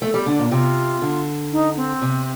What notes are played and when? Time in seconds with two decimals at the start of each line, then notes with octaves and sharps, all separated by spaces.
0.01 A3 A4
0.14 G3
0.26 D3 D4
0.39 A#2
0.51 C3 F4
1.02 D3
1.52 D#4
1.76 C4
2.02 C3